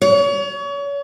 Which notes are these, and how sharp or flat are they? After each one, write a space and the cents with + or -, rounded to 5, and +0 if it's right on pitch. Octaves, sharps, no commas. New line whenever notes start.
C#5 +35